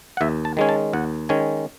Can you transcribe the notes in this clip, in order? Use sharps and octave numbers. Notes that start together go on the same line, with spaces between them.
F#5
D#2 E5
A5
D#3 G#3 C#4 G#5
A5
D#2 F#5
D#3 G#3 C#4 G#5